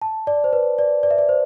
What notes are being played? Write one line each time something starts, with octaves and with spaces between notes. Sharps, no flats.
A5
D5
C5
B4
D5
D5
E5
D5
C5